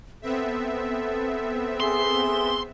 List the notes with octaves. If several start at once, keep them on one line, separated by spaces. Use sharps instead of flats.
B3 C4 A4 E5
G#4 C6